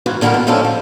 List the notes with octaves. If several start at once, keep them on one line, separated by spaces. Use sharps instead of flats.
G#2 C#3 E3 A#3 F#4
A#2 D3 D#3 G3 A4 A#4
B2
A2 F3 G#3 C#4 D4 A4
F3